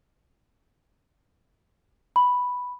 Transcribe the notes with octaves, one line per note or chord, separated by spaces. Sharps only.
B5